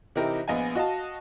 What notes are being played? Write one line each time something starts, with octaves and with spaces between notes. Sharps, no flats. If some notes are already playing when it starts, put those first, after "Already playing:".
C3 E3 D#4 E4 G4 A#4
A#1 B3 D#5 F5 G#5
F#4 D#5 F5 A5